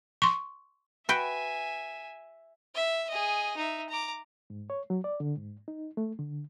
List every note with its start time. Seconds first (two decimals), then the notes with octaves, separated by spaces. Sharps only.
0.22 C6 C#6
1.09 F#4 B4 E5 G5 G#5
2.75 E5
3.09 G#4 D#5
3.57 D#4 E5
3.89 A#5 D6
4.50 G#2
4.70 C#5
4.90 F#3
5.04 D5
5.20 D3
5.37 G#2
5.68 D#4
5.97 A3
6.19 D3